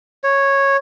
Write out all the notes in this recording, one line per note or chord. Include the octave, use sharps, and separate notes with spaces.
C#5